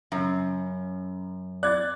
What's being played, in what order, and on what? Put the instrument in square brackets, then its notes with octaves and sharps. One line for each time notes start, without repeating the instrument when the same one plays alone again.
[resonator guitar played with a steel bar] F#2 [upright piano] C#3
[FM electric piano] D5 [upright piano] F#6 G#6 A6